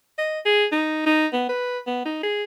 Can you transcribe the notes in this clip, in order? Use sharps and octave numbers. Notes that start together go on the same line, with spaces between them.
D#5
G#4
D#4
D#4
B3
B4
B3
D#4
G#4